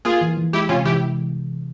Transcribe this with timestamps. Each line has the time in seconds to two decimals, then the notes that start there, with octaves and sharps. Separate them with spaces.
0.05 A#3 F4 G#4
0.21 E3
0.37 E3
0.53 G#3 E4 G4
0.69 C3 C#4 F4
0.85 E3 E4 G4